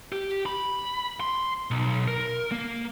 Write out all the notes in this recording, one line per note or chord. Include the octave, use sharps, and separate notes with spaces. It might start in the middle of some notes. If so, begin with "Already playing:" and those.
G4
B5
C6
B1
A#4
A#3